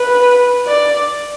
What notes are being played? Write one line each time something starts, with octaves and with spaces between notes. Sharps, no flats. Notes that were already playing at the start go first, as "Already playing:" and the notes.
Already playing: B4
D5